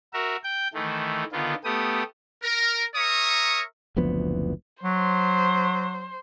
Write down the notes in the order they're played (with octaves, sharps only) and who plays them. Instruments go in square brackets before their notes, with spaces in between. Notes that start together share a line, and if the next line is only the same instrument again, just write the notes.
[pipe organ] F#4 A#4 E5
G5 G6
D#3 E3 A3
D3 D#3 B3 F4
A3 B3 G4 D#6
[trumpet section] A#4
A#4 C#5 E5 A#5 C#6 D#6
[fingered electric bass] F#1 D2 F3 B3
[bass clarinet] F#3 [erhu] C5